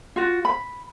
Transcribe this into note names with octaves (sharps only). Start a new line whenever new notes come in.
F4 F#4
B5